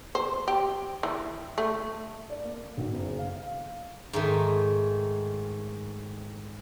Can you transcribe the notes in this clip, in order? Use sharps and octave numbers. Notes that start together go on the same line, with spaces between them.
C5
G4
E3
A3
D5
A#3
B1
F#1
F5
F5
G#2 D#3 A3